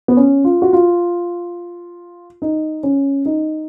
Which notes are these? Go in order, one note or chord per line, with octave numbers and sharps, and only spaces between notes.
B3
C#4
F4
F#4
F4
D#4
C#4
D#4